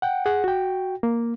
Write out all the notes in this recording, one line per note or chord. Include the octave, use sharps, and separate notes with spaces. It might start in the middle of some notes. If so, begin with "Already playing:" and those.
F#5 G5
G#4 F#5
F#4 G5
A#3